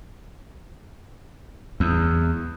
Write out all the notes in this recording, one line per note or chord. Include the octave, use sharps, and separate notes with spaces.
E2